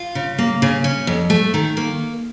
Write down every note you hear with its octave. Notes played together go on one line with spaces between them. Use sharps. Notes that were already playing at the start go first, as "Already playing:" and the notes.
Already playing: F4
C#3
A#3
C#3
C#4
F2
A3
D#3
A#3